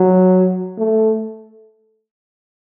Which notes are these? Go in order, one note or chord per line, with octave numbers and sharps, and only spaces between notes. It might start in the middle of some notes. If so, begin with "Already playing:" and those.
Already playing: F#3
A3